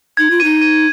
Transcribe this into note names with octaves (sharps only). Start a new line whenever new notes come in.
D#4 G#6
F4
D#4 D#7
D#7